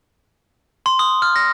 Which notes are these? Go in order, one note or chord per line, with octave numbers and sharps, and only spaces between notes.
C6
D#6
F6
A#6